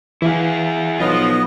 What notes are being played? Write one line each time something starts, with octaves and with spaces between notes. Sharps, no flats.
E3 E4 G#4 F5
B1 F3 B3 F4 D#5